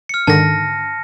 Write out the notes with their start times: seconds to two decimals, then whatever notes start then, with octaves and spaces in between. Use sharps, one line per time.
0.09 F6 C#7
0.27 G#2 D3 D#3 A5 A#6